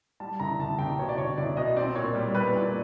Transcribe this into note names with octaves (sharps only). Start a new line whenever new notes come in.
G3 A5
C2 A#5
C2 A5
C2 G5
B2 C#5
D5
C2 C#5
C2 D5
B2 D#5
C4 D5
A#2 C#5
G3
G3 B4
A#2